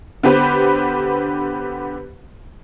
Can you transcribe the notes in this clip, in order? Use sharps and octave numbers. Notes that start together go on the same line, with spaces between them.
D3 B3 G4 B4 C5